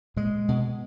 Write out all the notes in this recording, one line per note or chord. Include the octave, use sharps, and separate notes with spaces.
A#2 G#3
B2